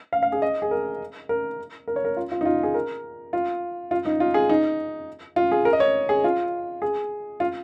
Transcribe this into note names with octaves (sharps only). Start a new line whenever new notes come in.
F5
F5
G#4
D#5
G#4
A#4
A#4
A#4
C#5
A#4
F4
F4
D#4
F4
G#4
A#4
F4
F4
D#4
F4
G#4
D#4
F4
G#4
A#4
D#5
C#5
G#4
F4
G#4
F4